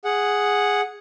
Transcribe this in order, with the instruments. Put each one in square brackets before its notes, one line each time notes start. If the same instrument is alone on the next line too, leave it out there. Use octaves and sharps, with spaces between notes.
[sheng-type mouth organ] G#4 F#5